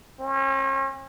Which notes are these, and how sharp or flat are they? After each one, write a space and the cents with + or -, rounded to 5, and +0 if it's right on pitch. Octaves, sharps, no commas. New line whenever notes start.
C#4 -40